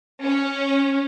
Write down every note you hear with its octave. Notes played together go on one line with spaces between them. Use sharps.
C#4